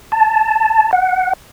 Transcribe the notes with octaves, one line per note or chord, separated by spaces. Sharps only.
A5
F#5